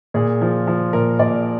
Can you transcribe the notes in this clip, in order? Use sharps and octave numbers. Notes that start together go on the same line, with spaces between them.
A#2 G#4
F3
F3
A#2 A#4
A#2 D5